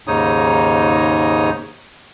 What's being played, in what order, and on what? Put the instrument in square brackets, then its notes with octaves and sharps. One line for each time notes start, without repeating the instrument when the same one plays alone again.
[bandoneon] D#2 G#2 C#3 D#4 C#5 D#6